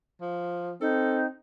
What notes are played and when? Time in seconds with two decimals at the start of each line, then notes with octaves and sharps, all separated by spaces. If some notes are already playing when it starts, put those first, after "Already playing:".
0.21 F3
0.81 C4 D#4 A4